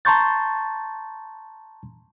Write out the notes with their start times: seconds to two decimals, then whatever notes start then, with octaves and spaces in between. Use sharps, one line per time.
0.05 A5 A#5 C6 C#6 G6 A6